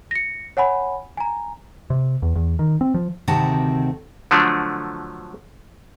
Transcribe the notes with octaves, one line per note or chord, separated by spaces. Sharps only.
A#6 C#7
C#5 F#5 G#5 B5
G#5 A#5
C3
E2
E2
D#3
C4
F3
D2 C3 D#3 C4 F#4 A5
D3 F3 F#3 A3 D4